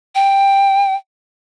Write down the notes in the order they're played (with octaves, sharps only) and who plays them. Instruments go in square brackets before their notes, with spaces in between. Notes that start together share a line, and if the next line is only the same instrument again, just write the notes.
[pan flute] G5